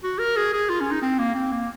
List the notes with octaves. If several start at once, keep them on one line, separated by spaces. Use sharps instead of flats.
F#4
A#4
G#4
G#4
F4
C#4
D#4
C4
A#3
C4
A#3